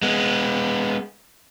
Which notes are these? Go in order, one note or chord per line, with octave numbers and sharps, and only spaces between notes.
G#3 B3